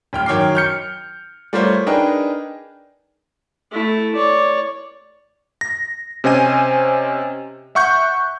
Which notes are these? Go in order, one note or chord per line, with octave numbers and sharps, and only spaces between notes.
D1 G5 F6
F#2 D#3 C#5 G5 D6 C7
F6 G6 C#7
G3 A3 F4 A#4 C5 C#5
D4 D#4 G#4 A#4 B4 G5
A3 E4
C#5 D5
A#6
C3 C#4 C5 D#5 G#5 D#7
E5 F#5 C#6 F#6 G6